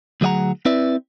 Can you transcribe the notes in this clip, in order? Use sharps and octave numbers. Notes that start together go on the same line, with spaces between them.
D2 F#3 G#4 D#5 F#5 A#5
C4 E4 B4 D5 E5